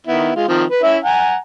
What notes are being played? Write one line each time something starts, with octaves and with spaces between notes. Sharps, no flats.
D#3 B3 E4
G#3 F4
D#3 F3 C4
B4
C#4 E4 E5
F#5 G#5 A#5